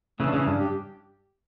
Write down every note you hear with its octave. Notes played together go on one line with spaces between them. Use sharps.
C#3 E3 A3
D4
C#3 E3 C#4
G2 D4
G4